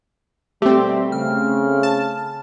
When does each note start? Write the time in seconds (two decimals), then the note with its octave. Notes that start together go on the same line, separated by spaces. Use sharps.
0.62 B2 G3 A3 C4 G4
1.12 C#3 F6
1.83 A5